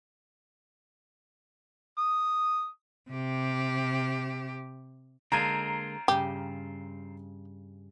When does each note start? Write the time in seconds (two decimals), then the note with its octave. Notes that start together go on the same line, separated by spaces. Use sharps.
1.98 D#6
3.10 C3 G4
5.32 D3 G#3 A#3 C4 F4 A#5 G#6 D#7
6.08 G2 C#3 G4